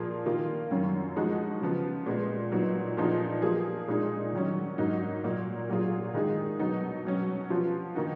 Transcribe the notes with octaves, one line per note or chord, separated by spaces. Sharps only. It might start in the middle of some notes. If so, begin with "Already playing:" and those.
Already playing: A#2 F3 A#3 F4 G#4
D#3 A#3 F4
F#2 D#3 F#3 C#4
F3 G#3 D#4 F#4
C#3 F3 B3
A#2 G#3 B3
A#2 F#3 B3 D#4
A#2 F3 B3 D#4 G#4
F3 A#3 F4 G#4
A#2 G#3 D#4 G#4
D#3 F#3 C#4
G#2 F#3 A#3 D#4 F#4
A#2 F#3 A#3
A#2 F#3 A#3 F4 G#4
D#3 G#3 D#4 G#4
B2 F#3 B3 D#4
B2 F#3 C#4
F3 B3 F4
D#3 A#3 D#4 F#4